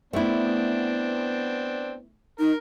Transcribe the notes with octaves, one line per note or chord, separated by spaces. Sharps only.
A3 B3 C4 D4 E4
D#4 A#4